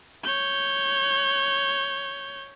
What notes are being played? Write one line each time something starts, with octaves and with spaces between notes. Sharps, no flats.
C#5 G6